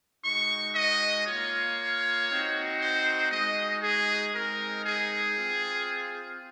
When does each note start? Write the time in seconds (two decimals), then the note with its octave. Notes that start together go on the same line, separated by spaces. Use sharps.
0.23 G#3 D#4 F#4 C#6
0.75 D#5
1.26 A#3 F4 C#5
2.29 C4 D#4 F#4
2.81 C5
3.31 G#3 D#4 F#4 D#5
3.82 G#4
4.33 G#3 C4 D#4 A#4
4.85 G#4
5.36 C4 F4